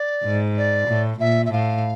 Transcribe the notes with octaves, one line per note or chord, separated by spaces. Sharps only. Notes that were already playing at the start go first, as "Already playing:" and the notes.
Already playing: D5
G#2
D5
A2
A#2 E5
E5
A2 F5